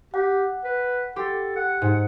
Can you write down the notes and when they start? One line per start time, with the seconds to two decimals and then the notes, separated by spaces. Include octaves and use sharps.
0.14 G4 F#5
0.64 B4
1.16 G4 A4 C6
1.56 F#5
1.82 G#2